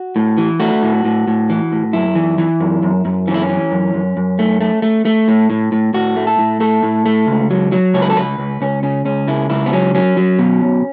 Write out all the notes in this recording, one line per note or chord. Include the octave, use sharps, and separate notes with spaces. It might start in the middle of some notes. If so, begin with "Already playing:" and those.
Already playing: F#4
A2
E3
A3 F#4
A2
A2
A2
E3
A2
F#2 E4
E3
E3
F#2
F#2
F#2
E3 C#4
E4
C#4
E3
F#2
F#2
F#2
A3
A3
A3
A3
A2
A2
A2
A2 F#4
A3
A4
A2
A3 A4
A2
A3
C#2
F#3
F#3
C#2 C#5
B4
A4
C#2 B4
C#2
C#2 C#4
C#3 C#4
C#2 C#4
C#3 E4
C#2 E4
B3
F#3 C#4
F#3 C#4
F#3
B2
B1